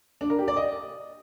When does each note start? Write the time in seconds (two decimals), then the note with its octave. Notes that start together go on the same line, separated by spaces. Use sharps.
0.21 D4
0.30 A#4
0.39 G4
0.48 D5
0.57 D#5